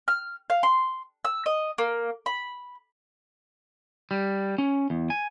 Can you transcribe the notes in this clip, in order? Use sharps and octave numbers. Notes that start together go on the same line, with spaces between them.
F6
F5
C6
E6
D#5
A#3
B5
G3
C#4
E2
G#5